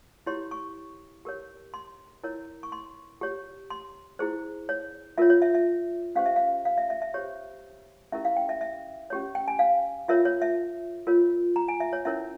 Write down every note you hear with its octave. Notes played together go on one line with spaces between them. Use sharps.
E4 G4 C#5 C6
C#6
G4 A#4 C#5
C6
E4 A#4 C#5
C#6
C6
G4 C#5
C6
E4 G#4 C5
C#5
F4 A#4 C#5 E5
C#5
E5
E5
C#4 G4 C5 F5
E5
F5
F5
E5
E5
E5
G4 C5 C#5
C#4 E4 G4 A#4 E5
F5
G5
E5
E5
C#4 G4 C#5
G5
G#5
F5
F4 A#4 C#5 E5
C#5
E5
F4 A#4 C#5
A#5
G#5
E5
C#5
C#4 E4 A#4 C#5 E5